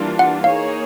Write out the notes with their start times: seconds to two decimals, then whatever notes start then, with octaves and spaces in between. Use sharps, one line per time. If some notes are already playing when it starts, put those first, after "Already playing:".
Already playing: E3 G3 A#3 D4 F4
0.19 F#5
0.44 A#3 D#4 G#4 C#5 F5